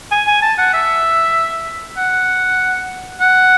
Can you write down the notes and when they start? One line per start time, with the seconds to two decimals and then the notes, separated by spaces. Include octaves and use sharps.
0.11 G#5
0.27 G#5
0.42 A5
0.58 F#5
0.74 E5
1.97 F#5
3.21 F#5